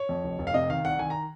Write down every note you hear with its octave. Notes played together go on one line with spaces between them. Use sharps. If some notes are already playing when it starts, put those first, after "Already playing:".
Already playing: C#5
F2
F1
F1
F5
C3 D#5
D#3 F5
C2 F#5
D#3 G#5
A#5